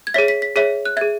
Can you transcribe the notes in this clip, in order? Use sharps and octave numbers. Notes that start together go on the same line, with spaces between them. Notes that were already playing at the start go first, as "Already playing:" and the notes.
G#6
G#4 C#5 E5 B6
B6
B6
G#4 C#5 E5 B6
F#6
G#4 E5 G#6